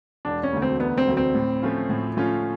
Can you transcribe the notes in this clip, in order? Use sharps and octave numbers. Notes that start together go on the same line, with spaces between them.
E1 D4
C#4
D2 D3 F#3 A3
C4
E1 B3
C4
D2 D3 F#3 A3
C4
A2
F3 A3 C#4 F4
A2
F3 A3 C#4 F4